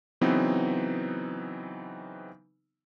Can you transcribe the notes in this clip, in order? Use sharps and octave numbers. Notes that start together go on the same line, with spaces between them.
C#3 E3 F#3 B3 C4 D#4